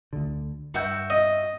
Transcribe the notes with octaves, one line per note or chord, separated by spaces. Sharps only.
D2 D3
G2 F#4 E5 G5
D#5